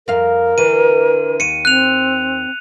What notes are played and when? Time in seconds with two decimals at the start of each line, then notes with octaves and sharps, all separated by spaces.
0.08 F2 A#4 F5
0.58 D3 E3 D#7
1.40 D#2 C#7 D#7
1.65 C4 F#6 F7